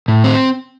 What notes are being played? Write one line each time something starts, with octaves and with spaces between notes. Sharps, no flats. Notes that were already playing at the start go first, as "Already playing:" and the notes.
A2
C4